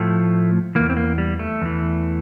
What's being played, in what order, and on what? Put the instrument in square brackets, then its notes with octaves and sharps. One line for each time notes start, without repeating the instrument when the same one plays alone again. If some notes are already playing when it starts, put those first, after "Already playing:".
Already playing: [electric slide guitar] A2 F3 A3
E2 E3 A#3
C4
A#3
G3
A3
E2 E3